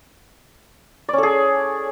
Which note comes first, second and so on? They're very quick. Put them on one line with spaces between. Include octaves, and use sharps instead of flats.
D5 C#4 A4 G#4